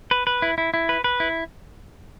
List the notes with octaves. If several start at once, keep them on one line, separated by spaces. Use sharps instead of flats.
B4
B4
E4
E4
E4
B4
B4
E4